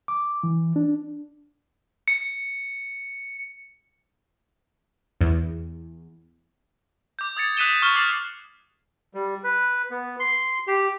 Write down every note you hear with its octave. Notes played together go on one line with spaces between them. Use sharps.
D6
E3
D4
C#7
E2
D6 G6
D#6 G#6 A6 C#7
D#6 F#6 B6 D#7 E7 G7
C#6 F6 G7
D6 F6 A6 C7 F#7
G3
B4
B3
C6
G4